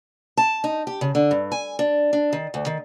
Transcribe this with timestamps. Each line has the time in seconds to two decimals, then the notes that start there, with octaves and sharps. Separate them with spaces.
0.37 A5
0.64 D#4
0.87 G4
1.01 C#3
1.15 D3
1.31 G2
1.52 G#5
1.79 D4
2.13 D4
2.33 D#3
2.54 D2
2.66 D#3